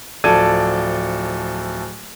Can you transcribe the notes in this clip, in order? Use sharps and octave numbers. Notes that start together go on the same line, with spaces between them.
D1 F3 A4 D5 G#6 D#7